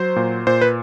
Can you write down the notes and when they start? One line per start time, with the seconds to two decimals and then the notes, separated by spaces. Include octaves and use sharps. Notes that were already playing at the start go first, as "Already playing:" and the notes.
Already playing: F#3 C5
0.16 A#2
0.47 A#2 C5
0.61 B4